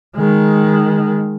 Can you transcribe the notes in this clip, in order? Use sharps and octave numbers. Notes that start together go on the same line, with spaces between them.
D#3 G#3